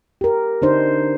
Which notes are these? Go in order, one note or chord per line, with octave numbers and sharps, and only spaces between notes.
G4 A#4
D3 D4 D#4 C5